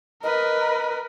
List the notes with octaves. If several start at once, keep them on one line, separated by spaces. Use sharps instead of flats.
A#4 B4 D#5